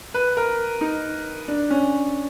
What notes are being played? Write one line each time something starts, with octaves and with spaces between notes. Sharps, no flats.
B4
A#4
D#4
D4
C#4